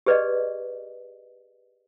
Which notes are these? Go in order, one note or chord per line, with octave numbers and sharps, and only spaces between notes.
G4 G#4 B4 D5 D#5